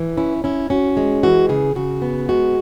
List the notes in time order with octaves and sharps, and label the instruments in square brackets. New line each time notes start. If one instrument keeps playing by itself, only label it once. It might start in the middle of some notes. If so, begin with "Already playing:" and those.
Already playing: [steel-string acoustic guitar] E3
C#4 E4
C#4 E4
C#4 F#4
G#3
E3 F#4
C#3 G#4
C#3 F#4
B3
G#3 F#4